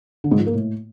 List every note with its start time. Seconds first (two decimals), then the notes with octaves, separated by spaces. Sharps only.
0.24 D3
0.31 G#2
0.39 F3
0.46 A#3
0.54 A2